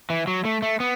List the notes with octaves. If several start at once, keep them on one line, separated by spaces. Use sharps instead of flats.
E3
F#3
A3
A3
B3